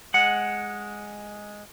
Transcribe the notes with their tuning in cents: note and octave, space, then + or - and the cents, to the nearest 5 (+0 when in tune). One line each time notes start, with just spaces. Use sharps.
G#3 +0 F#5 -5